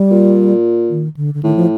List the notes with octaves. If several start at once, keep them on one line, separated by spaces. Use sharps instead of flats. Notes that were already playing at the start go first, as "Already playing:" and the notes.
Already playing: G3
A#2
D#3
D3
D3
A2 D#3
F3